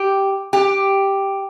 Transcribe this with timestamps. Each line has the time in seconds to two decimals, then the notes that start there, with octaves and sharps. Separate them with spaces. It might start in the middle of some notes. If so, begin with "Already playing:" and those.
Already playing: G4
0.53 G4